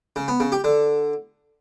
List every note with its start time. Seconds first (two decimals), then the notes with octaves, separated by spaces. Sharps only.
0.16 C#3
0.28 B3
0.40 C#3
0.52 G4
0.64 D3